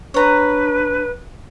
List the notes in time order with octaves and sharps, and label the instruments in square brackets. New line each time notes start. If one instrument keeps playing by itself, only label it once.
[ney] D4 [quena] B4 [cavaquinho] C#5 A#5